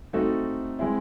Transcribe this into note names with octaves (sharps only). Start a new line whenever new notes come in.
A3 C4 D#4 F#4 A4
E3 G#3 C4 E4